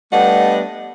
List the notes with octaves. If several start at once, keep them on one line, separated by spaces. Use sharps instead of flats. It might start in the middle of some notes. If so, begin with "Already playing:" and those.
G3 A3 B3 D4 D#5 F#5